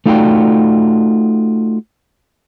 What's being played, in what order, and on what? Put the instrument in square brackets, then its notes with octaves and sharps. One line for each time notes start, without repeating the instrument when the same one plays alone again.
[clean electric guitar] A3 D#4 F4 F#4 D5 G5